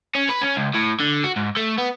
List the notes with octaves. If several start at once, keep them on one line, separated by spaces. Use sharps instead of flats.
C#4
B4
C#4
C#2
A2
D3
F#4
G#2
A3
B3